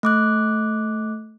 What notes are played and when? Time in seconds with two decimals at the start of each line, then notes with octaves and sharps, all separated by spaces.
0.03 A3 D6 F#6